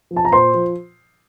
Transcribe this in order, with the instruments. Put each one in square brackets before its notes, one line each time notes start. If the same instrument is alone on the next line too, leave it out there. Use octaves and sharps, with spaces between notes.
[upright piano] F3
A5
A#5
A#2 C5 C6
F3